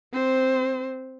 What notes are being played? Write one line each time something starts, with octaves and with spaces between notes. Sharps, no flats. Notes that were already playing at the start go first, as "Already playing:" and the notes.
C4 C5